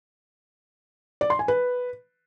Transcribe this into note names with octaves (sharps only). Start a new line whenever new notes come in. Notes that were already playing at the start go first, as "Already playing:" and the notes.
D5
C6
G#5
B4